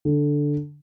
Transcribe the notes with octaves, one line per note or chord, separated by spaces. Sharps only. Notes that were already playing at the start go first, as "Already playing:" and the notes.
D3